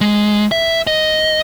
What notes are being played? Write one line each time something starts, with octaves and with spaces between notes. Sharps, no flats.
G#3
E5
D#5